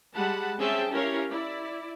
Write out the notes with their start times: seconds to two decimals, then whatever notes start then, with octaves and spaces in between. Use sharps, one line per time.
0.13 G3 G#3 F#5 A5 B5
0.58 C4 C#4 G#4 E5 G5 A5
0.91 C#4 E4 G4 A#4 C#5 F5
1.30 E4 D5